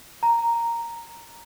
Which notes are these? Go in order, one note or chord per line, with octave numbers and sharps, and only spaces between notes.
A#5